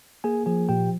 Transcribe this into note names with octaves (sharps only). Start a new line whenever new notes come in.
A#3 G#4 G#5
F3 G#4 G#5
A#2 G4 G5